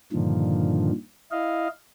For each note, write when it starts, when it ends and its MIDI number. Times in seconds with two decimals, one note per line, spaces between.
0.13 0.91 43
0.13 0.91 46
0.13 0.91 50
0.13 0.91 51
0.13 0.91 53
1.31 1.68 64
1.31 1.68 75
1.31 1.68 77